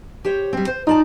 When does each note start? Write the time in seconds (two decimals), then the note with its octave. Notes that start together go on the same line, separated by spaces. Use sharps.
0.25 G4 C5 C#5
0.53 G3 C4
0.67 C5
0.87 D#4 F4 D5 A5